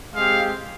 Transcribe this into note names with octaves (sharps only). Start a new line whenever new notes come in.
G#3 C4 G4 F5